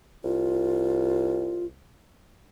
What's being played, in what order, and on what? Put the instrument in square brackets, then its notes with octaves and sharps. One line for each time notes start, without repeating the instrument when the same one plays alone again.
[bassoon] C2 [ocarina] F4